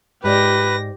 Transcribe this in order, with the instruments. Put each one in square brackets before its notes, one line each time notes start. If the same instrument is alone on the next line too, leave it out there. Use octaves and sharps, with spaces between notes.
[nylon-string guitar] G#2 D5 [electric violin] G4 A#6 [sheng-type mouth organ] B4